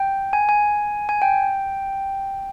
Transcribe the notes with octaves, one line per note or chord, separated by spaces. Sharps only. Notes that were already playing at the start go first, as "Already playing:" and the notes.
Already playing: G5
G#5
G#5
G#5
G5